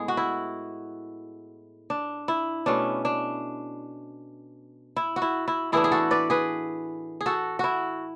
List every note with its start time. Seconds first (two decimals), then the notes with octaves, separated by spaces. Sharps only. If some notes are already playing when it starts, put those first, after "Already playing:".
Already playing: A2 G#3 B3 G#4
0.08 F#4
0.17 E4
1.90 D4
2.28 E4
2.66 B2 A3 C#4 D4
3.05 D4
4.96 E4
5.16 F#4
5.22 E4
5.48 E4
5.72 A2 E3 B3 D4 E4 G#4
5.84 G#4
5.92 F#4 A4
6.11 B4 D5
6.30 G#4 B4
7.21 G#4
7.26 F#4 A4
7.59 E4 F#4